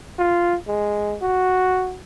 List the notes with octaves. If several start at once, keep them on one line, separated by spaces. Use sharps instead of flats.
F4
G#3
F#4